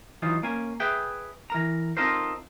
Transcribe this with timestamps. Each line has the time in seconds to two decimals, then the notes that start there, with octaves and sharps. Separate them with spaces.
0.22 E3 F#3 D#4 F4
0.43 A#3 C#4 G#5
0.80 G#4 B4 E5 G5
1.50 E3 A#4 A#5
1.97 C4 D#4 F4 A4 A#4 C5